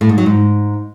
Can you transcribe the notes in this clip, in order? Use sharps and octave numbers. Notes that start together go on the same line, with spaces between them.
A2
G#2
F#3
G#2